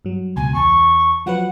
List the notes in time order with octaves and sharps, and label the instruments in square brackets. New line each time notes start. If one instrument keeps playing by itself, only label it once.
[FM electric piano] G2 F#3
[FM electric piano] C#2 B2 [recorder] G#5
[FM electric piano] E2 A5 [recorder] C#6
[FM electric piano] F3 F#3 B4 [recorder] F#5